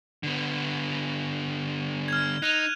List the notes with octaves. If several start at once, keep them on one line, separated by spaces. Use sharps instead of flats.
D3 B3
F6 G#6
D#4 F#6 D#7 F7